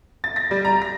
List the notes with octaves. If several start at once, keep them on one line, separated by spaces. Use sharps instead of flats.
A6
A#6
G3
A#5
A#6